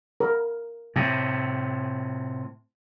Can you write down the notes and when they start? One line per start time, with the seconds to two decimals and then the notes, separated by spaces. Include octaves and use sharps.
0.20 A#4
0.96 A2 C3